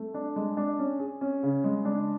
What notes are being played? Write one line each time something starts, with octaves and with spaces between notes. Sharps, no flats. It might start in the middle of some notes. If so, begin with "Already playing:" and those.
Already playing: A3
D4
G#3
D4
C#4
G#4
C#4
C#3
G#3
D4